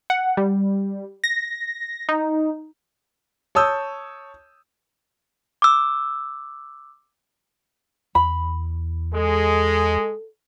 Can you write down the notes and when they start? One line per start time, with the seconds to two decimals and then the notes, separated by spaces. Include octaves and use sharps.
0.10 F#5
0.37 G3
1.24 A#6
2.09 D#4
3.55 C#5 A5 D#6 E6 G6
5.62 D6 E6
8.15 E2 B5
9.15 G#3 A4